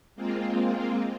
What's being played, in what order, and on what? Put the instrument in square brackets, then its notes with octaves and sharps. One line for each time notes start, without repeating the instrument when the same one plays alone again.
[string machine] G#3 A#3 C4 F4